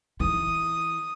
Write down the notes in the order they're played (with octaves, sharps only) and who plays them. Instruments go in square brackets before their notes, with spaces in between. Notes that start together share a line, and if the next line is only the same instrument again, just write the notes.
[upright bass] E3 [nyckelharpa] D#6